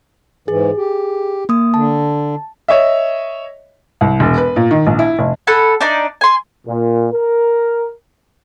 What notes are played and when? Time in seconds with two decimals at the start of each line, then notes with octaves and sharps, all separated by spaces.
0.48 G#2 E3 G#4
0.77 G4
1.49 A#3 D#6
1.74 D3 A5
2.68 C#5 D#5 E5
4.01 C2
4.20 E1
4.38 B4
4.56 A#2
4.71 D#3
4.87 A#1
4.99 E4
5.19 F1
5.47 A4 F#5 G#5 B5
5.81 D4 D#4 D5
6.21 G#5 C6
6.67 A#2
7.13 A#4